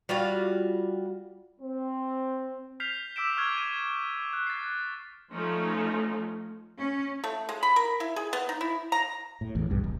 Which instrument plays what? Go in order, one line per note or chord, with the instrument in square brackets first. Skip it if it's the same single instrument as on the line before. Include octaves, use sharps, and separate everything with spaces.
[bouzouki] G3 F4 F#4 F5
[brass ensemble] C4
[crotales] F6 G6 B6 C7 F7
D6 E6 B6 D7 E7
C#6 F6 G#6
D#7
F#6
A6 C7
[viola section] F3 A3 C#4 D#4 F4
[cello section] C#4
[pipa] A3
G#3
B5
A#4
E4
G#4
B3
D#4
E4
A#5
[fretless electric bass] A2
A1 E2
B1 G2
D1